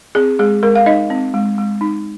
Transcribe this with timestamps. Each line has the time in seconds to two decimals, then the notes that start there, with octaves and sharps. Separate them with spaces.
0.15 C4 G#4
0.39 G#3 G#4
0.63 G#3 A#4
0.75 F5
0.86 D#4 D#5
1.10 C4
1.34 G#3
1.58 G#3
1.81 D#4